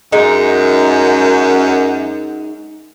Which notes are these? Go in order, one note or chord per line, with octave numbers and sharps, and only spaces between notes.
F#2 G#3 D#4